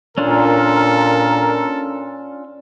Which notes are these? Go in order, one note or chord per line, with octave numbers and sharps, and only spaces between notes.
A#2 C#4 D4 F4 A4 A#4